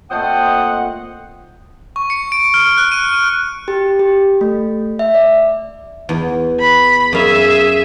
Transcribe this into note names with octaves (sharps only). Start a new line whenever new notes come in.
A#2 A3 C4 F4 C5 D#5 F#5
C#6
C#7
D7
F6
F#6
D#7
G4
G4
A3
E5
D5
E2
B5
F#2 G#4 E5 F5